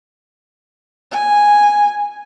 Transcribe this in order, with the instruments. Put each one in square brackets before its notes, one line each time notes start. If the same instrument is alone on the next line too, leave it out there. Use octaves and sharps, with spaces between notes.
[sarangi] G#5